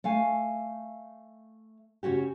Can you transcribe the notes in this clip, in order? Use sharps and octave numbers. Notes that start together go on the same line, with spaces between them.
A3 F5 G#5
C#3 C#4 F#4 G4